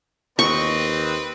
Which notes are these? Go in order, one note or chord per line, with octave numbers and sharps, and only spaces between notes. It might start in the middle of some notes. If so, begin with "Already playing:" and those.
D#2 C4 B4 D#5 C#6